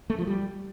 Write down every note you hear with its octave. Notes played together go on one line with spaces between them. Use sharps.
A3
F3
G3